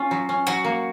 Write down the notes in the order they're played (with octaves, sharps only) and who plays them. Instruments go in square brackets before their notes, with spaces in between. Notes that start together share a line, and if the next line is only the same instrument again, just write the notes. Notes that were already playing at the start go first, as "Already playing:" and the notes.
Already playing: [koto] C#4 [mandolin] F4
[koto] F#3
C#4
[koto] F#3 [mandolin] F#4
[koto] A#3